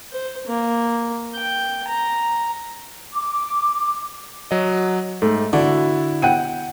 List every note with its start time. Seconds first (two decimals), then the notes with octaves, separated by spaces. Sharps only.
0.11 C5
0.47 A#3
1.35 G5
1.88 A#5
3.12 D6
4.51 F#3 D#5
5.22 G#2 A3
5.53 D3 E4 F#4
6.22 F#5 G5 D#7